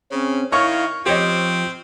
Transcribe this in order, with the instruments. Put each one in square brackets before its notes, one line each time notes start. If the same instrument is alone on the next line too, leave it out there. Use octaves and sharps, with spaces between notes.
[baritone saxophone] C#3 [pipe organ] C4 C#4
[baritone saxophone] D#3 [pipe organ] E4 F5 [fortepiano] C#5 [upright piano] C#6 F6
[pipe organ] F3 [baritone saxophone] C4 [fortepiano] G4 C#5 D#5